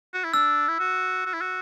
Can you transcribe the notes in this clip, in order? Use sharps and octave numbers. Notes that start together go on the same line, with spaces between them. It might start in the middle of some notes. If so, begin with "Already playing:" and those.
F#4
E4
D4 E6
E4
F#4
F#4
E4
F#4